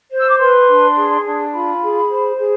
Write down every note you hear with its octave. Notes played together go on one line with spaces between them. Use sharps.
C5
E6
D6
B4 C6
D4
G#4
D4
F4 B5
G#4
C5
G#4